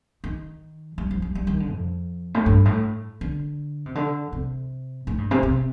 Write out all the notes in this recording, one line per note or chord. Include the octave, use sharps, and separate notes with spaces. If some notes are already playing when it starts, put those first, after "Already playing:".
D#3
G3
F3
G3
G3
D#3
D3
F2
A2
G2
A2
D3
C3
D3
C3
A2
G2
C3
C3